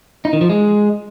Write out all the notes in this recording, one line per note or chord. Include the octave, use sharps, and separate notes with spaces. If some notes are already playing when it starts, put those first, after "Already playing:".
D#4
D#3
F3
G#3